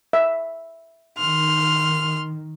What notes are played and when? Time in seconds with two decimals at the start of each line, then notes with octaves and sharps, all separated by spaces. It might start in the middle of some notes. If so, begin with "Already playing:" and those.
0.13 E5
1.18 D#3 C6 F6